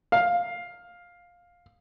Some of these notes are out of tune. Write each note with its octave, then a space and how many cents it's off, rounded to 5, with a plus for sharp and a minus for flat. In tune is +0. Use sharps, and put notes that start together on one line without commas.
F5 +10